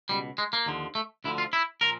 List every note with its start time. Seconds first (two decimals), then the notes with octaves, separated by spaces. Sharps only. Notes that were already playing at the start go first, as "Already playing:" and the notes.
0.09 C#2 B2 G3
0.38 G#3
0.53 A#3
0.66 D#2 D3 F3
0.95 A3
1.24 D2 D3 F3 E4
1.38 F4
1.53 E4
1.81 A#2 F3 A#4